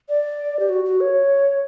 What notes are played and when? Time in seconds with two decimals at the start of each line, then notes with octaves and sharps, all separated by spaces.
0.09 D5
0.59 G4
0.69 F#4
0.85 F#4
1.01 C#5